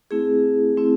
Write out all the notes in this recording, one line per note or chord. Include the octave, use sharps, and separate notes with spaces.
A3 C4 E4 G#4
A3 C4 E4